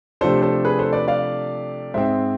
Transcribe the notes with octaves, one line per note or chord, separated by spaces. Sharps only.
C3 F3 A3 D4 A4 C5
A4 C5
G#4 B4
A4 C5
B4 D5
D5 F5
G#2 G#3 C4 C5 E5